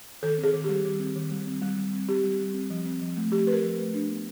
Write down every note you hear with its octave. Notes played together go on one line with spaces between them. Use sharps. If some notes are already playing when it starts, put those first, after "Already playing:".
D#3 A4
C4
G#4
D#3
G3 G4
D#3
C4
D#3
G3
C4
G3
G3
C4
C4 G4
G3
G3
C4
F3
C4
F3
A3
F3 G4
C4 B4
A#4
F3
A3
D4
B3